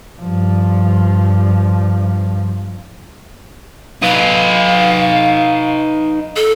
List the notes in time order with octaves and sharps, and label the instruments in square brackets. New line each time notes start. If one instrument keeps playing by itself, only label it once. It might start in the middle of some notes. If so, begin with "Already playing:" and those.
[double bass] G2 F3
[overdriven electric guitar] D#4 B4 [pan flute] F5
[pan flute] A4